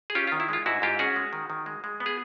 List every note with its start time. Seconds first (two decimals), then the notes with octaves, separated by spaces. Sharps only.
0.10 G#4
0.15 C#4 F4 G4
0.27 F4
0.32 D#3
0.40 E4
0.49 G#3 F4
0.66 G#2 E4 F#4
0.82 G#2 F4 G4
0.99 C#4 F#4 G#4
1.16 G#3
1.33 D#3
1.50 D#3
1.66 G#3
1.84 G#3
2.00 B3
2.06 G#4